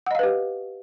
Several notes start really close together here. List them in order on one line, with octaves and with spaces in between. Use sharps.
F#5 D#5 F5 B4 G4